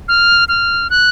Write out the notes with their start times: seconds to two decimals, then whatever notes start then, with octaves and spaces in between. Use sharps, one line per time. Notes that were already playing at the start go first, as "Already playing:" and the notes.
0.08 F6
0.48 F6
0.90 F#6